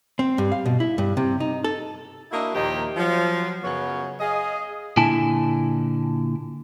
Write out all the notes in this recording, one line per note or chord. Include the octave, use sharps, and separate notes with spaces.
C4
G2
F5
B2
E4
G2
C3
D#4
A4
A#3 D4 E4 F#4 D#5 E5
D#2 A#2 F3 G4 D#5
F3 F#3
F#2 C#3 B3 C#5
G#4 D#5 F5
A#2 D3 E4 G#5 A5